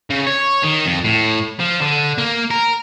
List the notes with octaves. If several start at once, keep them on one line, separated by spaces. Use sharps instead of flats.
C#3
C#5
D#3
F2
A2
F3
D3
A#3
A#4